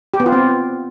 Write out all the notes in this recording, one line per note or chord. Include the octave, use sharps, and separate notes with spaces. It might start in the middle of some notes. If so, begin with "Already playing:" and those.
G4
B3
F4
C4